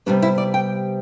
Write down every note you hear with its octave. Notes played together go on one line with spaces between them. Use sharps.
C3 G3 B3 D4
E4
D5
G5